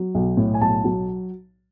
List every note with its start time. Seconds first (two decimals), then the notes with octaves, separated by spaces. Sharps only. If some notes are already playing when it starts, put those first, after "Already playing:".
Already playing: F#3
0.15 B1
0.37 A2
0.54 G#5
0.61 B1 A5
0.84 F#3